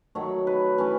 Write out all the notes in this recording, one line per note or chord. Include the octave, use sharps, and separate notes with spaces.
D#3 F#3 A3 C#5
B4
E3 A3 C#4